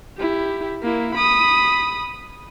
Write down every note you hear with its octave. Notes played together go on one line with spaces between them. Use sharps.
E4 G4
A#3 E4
B5 D#6